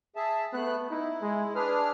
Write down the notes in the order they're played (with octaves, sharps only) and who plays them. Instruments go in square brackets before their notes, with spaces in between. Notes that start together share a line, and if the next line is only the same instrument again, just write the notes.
[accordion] G#4 E5 A5
[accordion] A3 F#6 [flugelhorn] B3
[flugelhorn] D#4 [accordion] E4
[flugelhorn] G#3
[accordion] D4 G#4 F6 [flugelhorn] B4